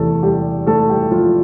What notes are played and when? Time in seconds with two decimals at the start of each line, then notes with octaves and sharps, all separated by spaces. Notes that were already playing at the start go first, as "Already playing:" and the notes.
Already playing: E2 C3 E3 A3 A4
0.23 G3 G4
0.66 A3 A4
0.89 G3 G4
1.11 F3 F4